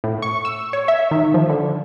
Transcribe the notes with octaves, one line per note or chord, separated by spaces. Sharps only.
A2
C#6
E6
C#5
E5
D#3
F3
D3